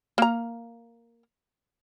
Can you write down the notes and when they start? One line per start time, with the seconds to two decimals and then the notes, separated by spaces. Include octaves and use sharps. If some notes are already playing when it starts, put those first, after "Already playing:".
0.18 A#3 A#5